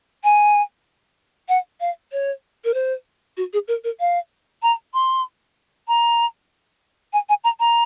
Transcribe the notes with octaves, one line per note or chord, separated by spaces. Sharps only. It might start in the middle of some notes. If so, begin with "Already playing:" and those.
G#5
F#5
F5
C#5
A#4
C5
F#4
G#4
A#4
A#4
F5
A#5
C6
A#5
G#5
G#5
A#5
A#5